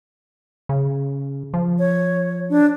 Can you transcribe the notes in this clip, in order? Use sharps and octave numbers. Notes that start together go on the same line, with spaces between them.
C#3
F3
C#5
D4